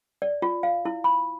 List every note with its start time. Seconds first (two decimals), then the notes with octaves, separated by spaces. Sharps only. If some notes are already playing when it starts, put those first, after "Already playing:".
0.22 D5
0.42 F4
0.63 F5
0.85 E4
1.04 B5